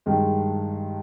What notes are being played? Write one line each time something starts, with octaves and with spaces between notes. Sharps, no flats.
G2 D#3 G#3